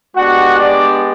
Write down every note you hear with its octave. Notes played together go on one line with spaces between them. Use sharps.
G#3 B3 D4 F#4 G4 F#5
D4 D5